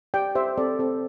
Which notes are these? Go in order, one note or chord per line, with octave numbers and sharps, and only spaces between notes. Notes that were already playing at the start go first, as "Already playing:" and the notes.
G4 D5 G5
G4 C5 E5
C4 A4 D5
C4 A4